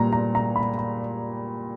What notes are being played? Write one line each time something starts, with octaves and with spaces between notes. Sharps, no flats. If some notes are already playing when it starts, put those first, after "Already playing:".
Already playing: A#2 G3 A#5
A#5
A#5
B5
B5